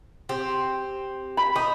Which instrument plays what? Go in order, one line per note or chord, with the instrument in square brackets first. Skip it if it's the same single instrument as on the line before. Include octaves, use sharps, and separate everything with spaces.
[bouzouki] C4 G4
[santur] B5
[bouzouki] D#4 [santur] D#6